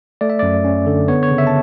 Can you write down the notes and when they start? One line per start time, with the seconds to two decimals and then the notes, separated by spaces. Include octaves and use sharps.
0.21 A3 D5
0.30 E5
0.39 F#2 D5
0.65 C#4
0.87 D3
1.08 B3 C#5
1.23 C#5
1.31 C#3
1.38 E5
1.47 A5